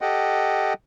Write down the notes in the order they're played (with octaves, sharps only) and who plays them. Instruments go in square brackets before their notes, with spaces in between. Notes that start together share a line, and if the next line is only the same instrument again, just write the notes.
[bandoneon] G4 A4 D#5 F#5 G5